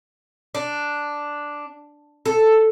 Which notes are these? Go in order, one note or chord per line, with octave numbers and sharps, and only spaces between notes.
D4
A4